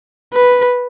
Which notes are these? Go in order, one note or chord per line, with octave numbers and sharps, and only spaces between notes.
B4